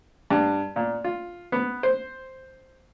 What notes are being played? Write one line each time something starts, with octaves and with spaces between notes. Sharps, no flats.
G2
A#2
F4
B3
C5